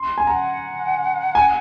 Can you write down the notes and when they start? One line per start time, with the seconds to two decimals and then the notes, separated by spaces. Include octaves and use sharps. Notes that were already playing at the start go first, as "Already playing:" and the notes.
Already playing: C6
0.18 G#5
0.27 F#5 A#5
1.35 G#5